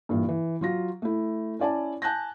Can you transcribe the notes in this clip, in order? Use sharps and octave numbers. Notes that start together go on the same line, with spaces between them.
G2 A#2 E3
E3
F#3 F4 A#6
A3 E4
C#4 E4 D5 G#5 A5
G#5 A5 F#6 G6 A#6